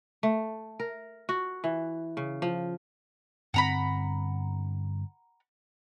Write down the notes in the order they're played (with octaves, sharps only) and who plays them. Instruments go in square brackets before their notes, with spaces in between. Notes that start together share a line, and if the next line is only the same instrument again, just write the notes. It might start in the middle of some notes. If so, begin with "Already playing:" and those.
[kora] A3
A#4
F#4
E3
C#3
F3
[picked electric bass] G2 D3 C4 [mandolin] F#5 A#5 B5